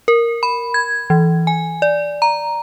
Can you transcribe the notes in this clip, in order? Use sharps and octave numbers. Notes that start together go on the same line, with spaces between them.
A#4
B5
G#6
E3
G#5
D5
A#5